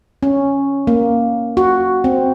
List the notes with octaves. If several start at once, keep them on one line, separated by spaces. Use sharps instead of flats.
C#4
A#3
F#4
C4